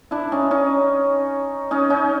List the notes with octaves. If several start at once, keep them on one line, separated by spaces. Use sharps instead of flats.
D4 E4
C#4 D#4
C#4 D#4
C#4 D#4
C#4 D#4